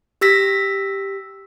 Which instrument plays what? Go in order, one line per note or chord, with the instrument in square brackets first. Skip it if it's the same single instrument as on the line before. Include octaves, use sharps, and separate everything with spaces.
[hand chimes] G4 E6 A#6 B6